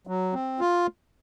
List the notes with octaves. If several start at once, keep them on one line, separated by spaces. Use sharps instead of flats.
F#3
C4
F4